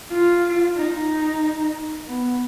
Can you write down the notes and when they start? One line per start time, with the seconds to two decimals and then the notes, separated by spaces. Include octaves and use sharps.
0.10 F4
0.76 D#4
2.06 B3